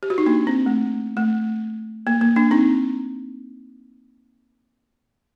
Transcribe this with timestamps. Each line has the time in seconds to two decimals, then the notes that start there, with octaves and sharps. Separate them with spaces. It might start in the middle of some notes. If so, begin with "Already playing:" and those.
0.03 G4
0.10 F#4
0.18 D#4
0.26 A#3 D4
0.47 C4
0.66 A3
1.17 A3
2.07 A#3
2.21 A#3
2.36 A#3 D4
2.51 C4 D#4